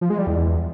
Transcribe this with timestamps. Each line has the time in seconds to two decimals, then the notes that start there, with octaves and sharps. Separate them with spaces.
0.01 F3
0.10 G#3
0.18 G3
0.27 E2